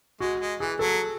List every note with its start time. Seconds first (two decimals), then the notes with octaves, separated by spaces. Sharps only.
0.20 G#3 F#4
0.40 G#3
0.60 E3 G#4
0.79 F#3 A4